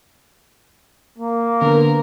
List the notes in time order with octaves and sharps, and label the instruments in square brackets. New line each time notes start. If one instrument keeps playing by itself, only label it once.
[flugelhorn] A#3
[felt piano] D3 B3 [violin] A#4